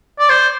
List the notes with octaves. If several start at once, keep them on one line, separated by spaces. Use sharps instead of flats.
D5
C5